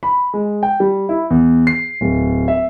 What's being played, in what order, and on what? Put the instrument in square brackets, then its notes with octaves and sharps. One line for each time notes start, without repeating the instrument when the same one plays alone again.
[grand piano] B5
G#3
G5
G3
E4
E2
C7
D1
E5